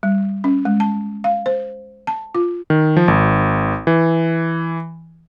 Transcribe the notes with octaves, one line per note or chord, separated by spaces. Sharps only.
G3
C#4
G#3
A5
F5
C5
A5
F4
D#3
F3
G#1
E3